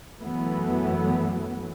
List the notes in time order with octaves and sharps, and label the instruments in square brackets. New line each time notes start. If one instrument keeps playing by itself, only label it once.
[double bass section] F#2 E3 F#3 A3 B3